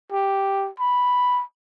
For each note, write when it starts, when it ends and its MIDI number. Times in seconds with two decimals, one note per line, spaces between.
0.12 0.69 67
0.80 1.42 83